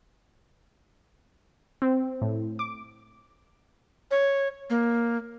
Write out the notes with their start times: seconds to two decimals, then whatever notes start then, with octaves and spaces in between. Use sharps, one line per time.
1.82 C4
2.21 A2
2.59 D6
4.11 C#5
4.70 A#3